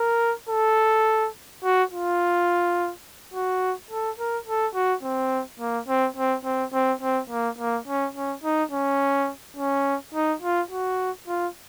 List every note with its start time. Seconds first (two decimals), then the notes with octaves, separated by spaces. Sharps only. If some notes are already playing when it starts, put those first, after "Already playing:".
Already playing: A#4
0.49 A4
1.64 F#4
1.92 F4
3.34 F#4
3.91 A4
4.18 A#4
4.47 A4
4.75 F#4
5.03 C4
5.60 A#3
5.88 C4
6.17 C4
6.45 C4
6.73 C4
7.01 C4
7.30 A#3
7.59 A#3
7.88 C#4
8.15 C#4
8.44 D#4
8.72 C#4
9.57 C#4
10.14 D#4
10.42 F4
10.71 F#4
11.28 F4